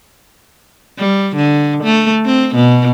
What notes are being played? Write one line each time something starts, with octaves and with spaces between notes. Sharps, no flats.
G3
D3
A3
C4
B2